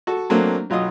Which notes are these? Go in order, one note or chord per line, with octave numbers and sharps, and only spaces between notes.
F#4 A4
F#3 A3 A#3 C4 D4
B1 F#3 F4 D#5 D#6